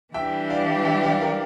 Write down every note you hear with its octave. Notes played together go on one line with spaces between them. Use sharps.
E3 G3 D4 G4 E5 G5
D5 F5
E5 G5
D5 F5
A#4 D5